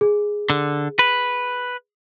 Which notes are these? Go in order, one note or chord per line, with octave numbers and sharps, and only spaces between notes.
G#4
D3
B4